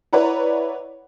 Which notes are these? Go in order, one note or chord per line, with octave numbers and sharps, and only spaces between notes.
E4 B4 C#5 D5 F#5 A#5